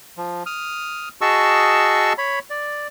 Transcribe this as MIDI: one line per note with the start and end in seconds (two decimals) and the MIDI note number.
0.17 0.43 53
0.46 1.09 87
0.46 1.09 89
1.21 2.13 66
1.21 2.13 68
1.21 2.13 75
1.21 2.13 81
1.21 2.13 85
1.21 2.13 88
2.18 2.39 73
2.18 2.39 83
2.50 2.87 74